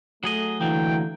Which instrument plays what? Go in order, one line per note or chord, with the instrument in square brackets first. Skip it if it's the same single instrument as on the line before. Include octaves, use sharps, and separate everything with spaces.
[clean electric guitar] F#3 G#4 D#5 [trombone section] A3
[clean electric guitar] D3 F#3 A#3 [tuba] E3 [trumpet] G5